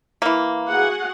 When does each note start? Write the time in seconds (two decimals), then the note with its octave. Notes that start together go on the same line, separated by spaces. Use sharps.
0.22 E3 A#3
0.69 F#4 G#4 F#5